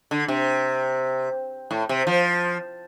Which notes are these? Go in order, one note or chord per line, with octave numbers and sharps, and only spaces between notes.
D3
C3
A2
C3
F3